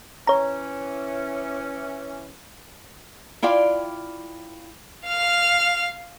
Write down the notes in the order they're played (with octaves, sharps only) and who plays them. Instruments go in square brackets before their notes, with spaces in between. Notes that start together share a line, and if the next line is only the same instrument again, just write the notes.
[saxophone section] E3 C#4 [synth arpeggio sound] C#5 A#5
[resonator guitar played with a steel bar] E4 F4 D5 F5 G5
[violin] F5 F6